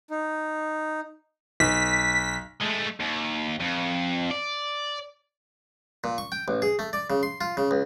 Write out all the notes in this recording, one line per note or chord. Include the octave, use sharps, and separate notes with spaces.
D#4
B1 B6
G#3 A3
D#2
F2
D5
A#2
C#6
G5
A1
G#4
A3
D5
C#3
C6
F4
C#3
C#2